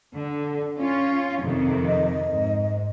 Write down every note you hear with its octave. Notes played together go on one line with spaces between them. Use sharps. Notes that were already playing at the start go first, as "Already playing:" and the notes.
D3
C#4 F4 C#5
F2 C3 D#3
D#5
G#2